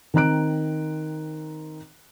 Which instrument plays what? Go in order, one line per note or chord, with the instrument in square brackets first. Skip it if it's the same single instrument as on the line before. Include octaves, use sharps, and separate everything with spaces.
[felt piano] D#3 C4 A#5 F#6 D7